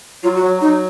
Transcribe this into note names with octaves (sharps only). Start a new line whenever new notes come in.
F#3 F4
F#4
F#3
F#3 D#4